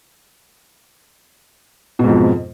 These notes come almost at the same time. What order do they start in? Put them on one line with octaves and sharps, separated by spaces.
B2 G#2 F2